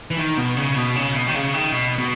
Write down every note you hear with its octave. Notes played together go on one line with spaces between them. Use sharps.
E3
D#3
B2
C#3
B2
C#3
B2
D#3
C#3
D#3
B2
B2